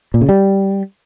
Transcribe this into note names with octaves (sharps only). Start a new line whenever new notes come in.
A#2
C#3
G3